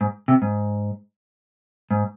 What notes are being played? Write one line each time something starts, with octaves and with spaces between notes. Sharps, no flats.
G#2
C3
G#2
G#2